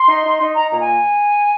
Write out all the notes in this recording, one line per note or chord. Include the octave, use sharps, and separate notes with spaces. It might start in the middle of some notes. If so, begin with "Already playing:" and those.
Already playing: C6
D#4
D#4
D#4
D#4 A#5
A#2 A#5
G#5